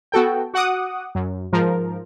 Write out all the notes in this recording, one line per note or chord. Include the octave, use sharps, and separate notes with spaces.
B3 F#4 A4 G5
F#4 F#5 D6 D#6
F#2
G#2 F3 A#4